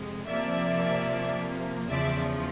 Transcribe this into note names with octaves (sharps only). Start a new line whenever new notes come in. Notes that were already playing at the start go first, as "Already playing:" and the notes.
Already playing: F2 C3 G#3
C3 F3 A#3 D5 E5
E2 C#3 F3 D5 E5